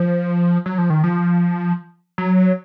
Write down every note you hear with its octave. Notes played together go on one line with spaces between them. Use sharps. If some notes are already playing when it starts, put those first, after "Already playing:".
Already playing: F3
F#3
F3
D#3
F3
F#3